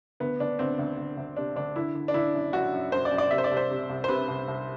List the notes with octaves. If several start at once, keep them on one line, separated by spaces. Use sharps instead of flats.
D2 B3
D2 D4
D2 C4
D2
D2
D2
C3 D4
D2 D4
D3 E4
D3
D4
D3 E4
F#2
F#2 F#4
F#2
F#2 C5
D5
F#2
D5
C3 E5
C5
D5
C2
C5
C3
C2
C5
C3 B4
C2
C2